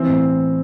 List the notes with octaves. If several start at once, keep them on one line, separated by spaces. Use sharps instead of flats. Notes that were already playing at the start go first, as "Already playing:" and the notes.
Already playing: E3 C4
A2